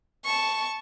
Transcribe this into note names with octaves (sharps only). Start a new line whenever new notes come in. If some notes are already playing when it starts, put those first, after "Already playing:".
A5 C#6